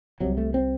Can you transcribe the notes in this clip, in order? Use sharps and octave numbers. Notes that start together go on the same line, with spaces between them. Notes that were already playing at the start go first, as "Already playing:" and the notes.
C2 C3 F#3
A3
C4